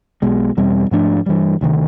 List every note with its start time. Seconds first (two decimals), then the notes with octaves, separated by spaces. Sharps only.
0.22 B1 B2 G#3
0.57 E2 B2 G3 C4
0.91 G#2 F3 A3 D4
1.26 G2 E3 G3
1.61 D2 C3 D#3